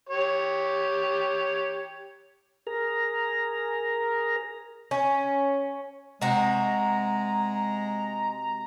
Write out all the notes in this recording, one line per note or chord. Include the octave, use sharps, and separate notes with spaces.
G4 C#5
G#4 A#4 A#5
C#4
C3 G#3 F#4 A#5